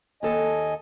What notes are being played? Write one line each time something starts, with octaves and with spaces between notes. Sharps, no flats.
D#2 A4 D#5 G#5